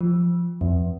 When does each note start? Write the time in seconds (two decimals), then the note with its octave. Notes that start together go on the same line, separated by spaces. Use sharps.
0.01 F3
0.61 F2